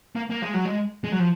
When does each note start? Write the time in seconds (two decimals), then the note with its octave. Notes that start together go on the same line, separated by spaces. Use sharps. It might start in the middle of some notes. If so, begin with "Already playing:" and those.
0.15 A#3
0.30 A#3
0.42 G#3
0.54 F#3
0.65 G#3
1.04 G#3
1.12 F#3
1.20 F3